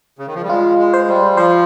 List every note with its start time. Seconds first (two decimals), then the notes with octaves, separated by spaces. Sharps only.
0.19 C#3
0.27 D#3
0.34 F3
0.43 G3
0.49 G#3 F4
0.79 G#3
0.94 C5
1.08 G3
1.36 F3 C5